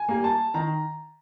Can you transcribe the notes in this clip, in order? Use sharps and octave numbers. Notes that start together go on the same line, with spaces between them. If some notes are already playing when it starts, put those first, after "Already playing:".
Already playing: G#5
G3 A#3
A5
D#3 A#5